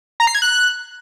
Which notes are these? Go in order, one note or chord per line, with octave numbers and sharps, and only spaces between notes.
A#5
C7
G#6
F#6